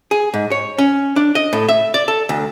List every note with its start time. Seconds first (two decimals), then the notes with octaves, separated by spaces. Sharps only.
0.11 G#4
0.34 G#2
0.52 C#5
0.78 C#4
1.16 D4
1.35 D#5
1.53 A2
1.69 E5
1.94 D5
2.08 A4
2.29 D2